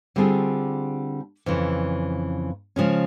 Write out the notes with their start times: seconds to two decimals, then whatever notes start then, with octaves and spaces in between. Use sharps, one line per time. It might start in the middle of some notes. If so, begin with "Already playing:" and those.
0.16 D3 G3 C4 F4 G#4
1.46 F2 C#3 E3
2.76 C#3 F3 G#3 C#4